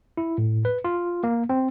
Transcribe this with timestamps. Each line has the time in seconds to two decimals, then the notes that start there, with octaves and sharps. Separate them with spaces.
0.17 E4
0.38 A2
0.65 B4
0.84 F4
1.23 A#3
1.49 C4